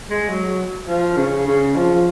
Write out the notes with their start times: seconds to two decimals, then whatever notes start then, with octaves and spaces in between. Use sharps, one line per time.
0.10 G#3
0.29 F#3
0.87 F3
1.17 C#3
1.46 C#3
1.76 F3
1.94 F3